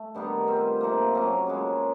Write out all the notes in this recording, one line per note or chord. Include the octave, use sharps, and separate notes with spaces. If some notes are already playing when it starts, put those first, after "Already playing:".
Already playing: A3
G2 D#3 G3 B3
G3 C4 F4
C3 F3 A#3
F#3 A#3 C#4
C#3 F3 G#3